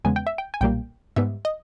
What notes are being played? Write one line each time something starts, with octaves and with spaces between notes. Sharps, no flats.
E2 C#3 G#3 B3 G#5
G5
E5
G5
G#5
B1 A#2 G3 A#3 G5
G#2 G3 B3 E5
D#5